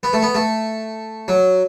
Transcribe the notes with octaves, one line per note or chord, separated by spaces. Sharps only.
B3
A3
B3
A3
F#3